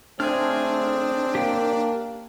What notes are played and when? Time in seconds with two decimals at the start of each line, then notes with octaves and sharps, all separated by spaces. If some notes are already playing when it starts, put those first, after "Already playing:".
0.20 A3 C4 D4 G#4 F6
1.35 A#3 G4 G5